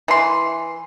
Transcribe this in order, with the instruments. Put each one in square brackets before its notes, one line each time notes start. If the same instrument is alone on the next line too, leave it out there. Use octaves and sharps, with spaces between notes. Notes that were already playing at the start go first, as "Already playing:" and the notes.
[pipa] E3 C6